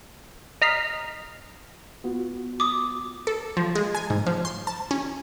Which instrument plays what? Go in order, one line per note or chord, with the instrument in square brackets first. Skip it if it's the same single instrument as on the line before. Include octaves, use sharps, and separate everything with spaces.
[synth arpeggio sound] D#5 A#5 F6 B6 C7
[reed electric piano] B3 F4 F#4
[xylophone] D6 D#6
[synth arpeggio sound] A4
F3
G#3
G#5
G#2
F3
C6
A5
C#4